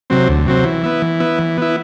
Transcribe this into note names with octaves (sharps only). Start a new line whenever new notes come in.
C3 F#3 C4
D2
C3 F#3 C4
E3
B3 E4
E3
B3 E4
E3
B3 E4